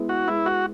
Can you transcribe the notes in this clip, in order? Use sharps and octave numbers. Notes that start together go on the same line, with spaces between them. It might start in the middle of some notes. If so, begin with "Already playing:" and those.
Already playing: G#3 B3 E4 G#4
F#4
G#3 E4
F#4